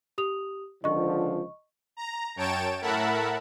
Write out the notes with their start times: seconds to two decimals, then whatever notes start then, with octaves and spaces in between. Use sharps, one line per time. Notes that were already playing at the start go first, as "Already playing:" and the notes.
0.18 G4 D#6 F7
0.84 C#2 D3 F3 D#5 C#6
1.97 A#5
2.36 F#2 C#5 G5 A5 D7 E7
2.81 A2 A#4 E5 F#5 A5 B5